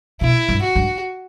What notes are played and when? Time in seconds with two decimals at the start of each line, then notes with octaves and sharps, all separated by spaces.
0.21 B2 E4
0.49 G2
0.62 F#4
0.76 G2